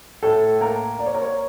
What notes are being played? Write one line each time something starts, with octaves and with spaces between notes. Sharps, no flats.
A2 A4
A#3 A#4
A#3 D5
C#5
A#4
C#5